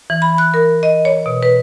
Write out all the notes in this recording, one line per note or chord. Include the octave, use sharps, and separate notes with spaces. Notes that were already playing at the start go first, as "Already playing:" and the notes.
E3
B5
F#6
A#4
D#5
C#5
B2
B4